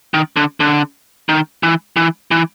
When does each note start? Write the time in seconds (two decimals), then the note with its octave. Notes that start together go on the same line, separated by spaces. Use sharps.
0.14 D#3
0.36 D3
0.60 D3
1.29 D#3
1.63 E3
1.96 E3
2.31 E3